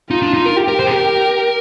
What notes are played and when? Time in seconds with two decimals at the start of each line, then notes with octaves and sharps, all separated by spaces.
0.11 D#4 F4
0.22 D4
0.34 D#4
0.46 A#4
0.57 G4
0.68 A#4
0.80 C5
0.87 G#4
0.91 A#4